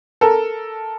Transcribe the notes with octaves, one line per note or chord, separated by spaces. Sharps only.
A4 A#4